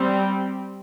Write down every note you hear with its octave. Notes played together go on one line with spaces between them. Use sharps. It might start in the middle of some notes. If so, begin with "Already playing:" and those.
Already playing: G3 C4